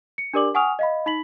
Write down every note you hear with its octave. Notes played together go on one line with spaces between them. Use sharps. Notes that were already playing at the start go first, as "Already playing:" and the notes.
C#7
D4 G4 A#4 D5 D6 F#7
F#5 G#5 C#6 D#6 F6 F7
D#5 F5 B5
D#4 B5 B6 F#7